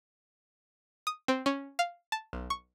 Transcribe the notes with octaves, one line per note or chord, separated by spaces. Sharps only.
D#6
C4
C#4
F5
A5
B1
C#6